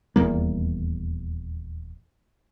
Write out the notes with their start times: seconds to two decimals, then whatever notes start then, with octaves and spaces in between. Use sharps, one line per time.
0.16 D#1 E2 A#3